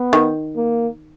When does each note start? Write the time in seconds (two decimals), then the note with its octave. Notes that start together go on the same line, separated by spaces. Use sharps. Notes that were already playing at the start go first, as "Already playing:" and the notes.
Already playing: B3
0.13 D#3
0.57 A#3